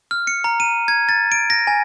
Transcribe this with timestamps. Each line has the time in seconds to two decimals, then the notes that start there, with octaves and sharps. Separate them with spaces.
0.11 F6
0.27 C#7
0.44 A#5
0.60 D#7
0.88 G#6
1.09 A6
1.32 D7
1.50 A#6
1.67 G#5